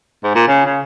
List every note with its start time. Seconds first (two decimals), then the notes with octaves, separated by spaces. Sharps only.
0.24 G#2
0.35 A#2
0.48 C#3
0.65 C#3